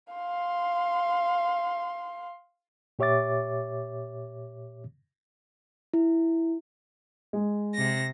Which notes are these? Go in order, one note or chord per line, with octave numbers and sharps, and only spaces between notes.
F5 C6
A#2 G4 C#5 E5 D6 A6
E4
G#3
C3 A#6